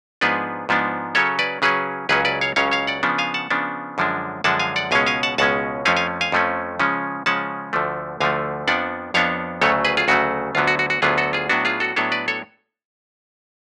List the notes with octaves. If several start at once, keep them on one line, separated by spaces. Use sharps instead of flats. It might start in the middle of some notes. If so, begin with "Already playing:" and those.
G#2 F3 B3 D4 G#4 B4
G#2 F3 B3 D4
C#3 F#3 C#4 A4 C#5
B4 D5
C#3 F#3 C#4 G#4 B4
C#2 C#3 F#3 C#4 G#4 B4
B4 D5
C#5 F5
C#2 C#3 F#3 C#4 C#5 F5
C#5 F5
D5 F#5
C#3 F3 B3 D4
F5 G#5
F#5 A5
C#3 F3 B3 D4
F#2 D3 F3 G#3 D4
F#2 D3 F3 G#3 D4 F#5 A5
F5 G#5
D5 F#5
C#2 B2 G#3 C#4 F5 G#5
F5 G#5
F#5 A5
C#2 B2 G#3 C#4 F#5 A5
F2 F3 A3 C#4 F5 G#5
F5 G#5
F5 G#5
F2 F3 A3 C#4
C#3 F3 G#3 C#4
C#3 F3 G#3 C#4 F#5 A5
D2 D3 F3 A3
D2 D3 F3 A3 F5 G#5
F2 F3 B3 D4 D5 F#5
F2 F3 B3 D4 C#5 F5
D2 C#3 F#3 A3 A4 C#5
G#4 B4
F4 G#4
D2 C#3 F#3 A3 F#4
D2 D3 F#3 B3 F4
F#4
F#4
F#4
D2 D3 F#3 B3 F4 G#4
F#4 A4
F4 G#4
A2 F#3 B3 D4 F#4
F4 G#4
F#4 A4
A2 F#3 B3 D4 A4 C#5
B4 D5
A4 C#5